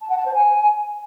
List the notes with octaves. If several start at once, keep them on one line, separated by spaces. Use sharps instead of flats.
A5
F#5
A5
C5
G#5